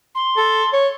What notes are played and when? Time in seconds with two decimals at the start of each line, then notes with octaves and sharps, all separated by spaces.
0.15 C6
0.37 A4
0.73 C#5